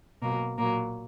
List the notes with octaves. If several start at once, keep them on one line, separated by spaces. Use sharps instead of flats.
B2 F#3 A#3
A#2 F#3 A#3